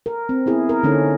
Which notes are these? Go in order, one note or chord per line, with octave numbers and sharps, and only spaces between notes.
A#4
C4
B3 E4 G#4
A#4
D3 A#3 C#4 D#4 A4